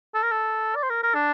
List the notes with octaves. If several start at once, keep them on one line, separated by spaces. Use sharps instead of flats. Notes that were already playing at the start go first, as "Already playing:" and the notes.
A4
A#4
A4
D5
C5
A#4
A#4
D4